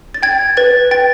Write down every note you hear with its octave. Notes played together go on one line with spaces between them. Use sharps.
A6
G5 G#6
B4 A6
G5 A6